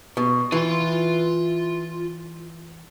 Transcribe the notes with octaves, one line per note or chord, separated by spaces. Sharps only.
B2
E3 F4 C6